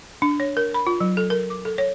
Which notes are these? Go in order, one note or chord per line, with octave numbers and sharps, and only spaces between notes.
D4
C#5
A#4
B5
F4
F#3
A4
A#4
D6
A4
C#5